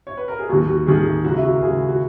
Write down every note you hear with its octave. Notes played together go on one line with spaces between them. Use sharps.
C#5
B4
A#4
G#4
D#2 D#3 F#3 F#4
F#4
D#2 D#3 F#3 G#4
F#4
G#4
C#2 C#3 F#3 F#4
E4
F#4
A#4
C#2 C#3 F#3 G#4
F#4